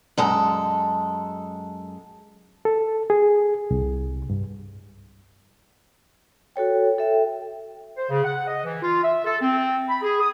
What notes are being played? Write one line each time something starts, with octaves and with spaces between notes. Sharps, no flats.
F#2 G#3 A4 A#5
A4
G#4
C2
G2
F#4 A4 C#5 G5
A4 E5 G5
C5
C#3
F#5
D#5
E3
F4
E5
A4
C4
B5
G#4
D#6